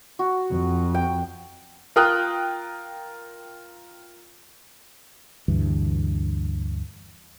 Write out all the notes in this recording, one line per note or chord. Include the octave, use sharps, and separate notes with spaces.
F#4
F2
G5
F4 A#4 G5 D#6 F6 F#6
D2 G2 E3